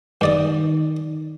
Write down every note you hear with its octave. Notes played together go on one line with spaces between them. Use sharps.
G2 D#3 D5 D#6